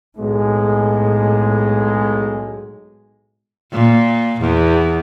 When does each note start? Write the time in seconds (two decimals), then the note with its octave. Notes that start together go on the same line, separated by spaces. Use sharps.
0.19 B1 A2 G#3
3.72 A#2
4.41 E2